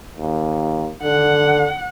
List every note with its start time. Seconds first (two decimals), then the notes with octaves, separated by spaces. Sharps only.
0.17 D#2
1.03 D3 F#5